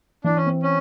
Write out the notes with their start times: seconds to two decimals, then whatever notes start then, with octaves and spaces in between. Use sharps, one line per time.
0.24 E3 D4
0.36 C#4
0.46 C4
0.63 C#4